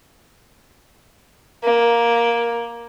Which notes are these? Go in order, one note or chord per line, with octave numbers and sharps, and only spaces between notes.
A#3